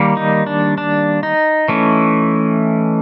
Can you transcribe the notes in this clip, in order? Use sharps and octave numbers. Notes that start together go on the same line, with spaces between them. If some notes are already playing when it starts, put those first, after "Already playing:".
Already playing: D#3 G3 A#3
D#4
D4
D4
D#4
E3 A3 C#4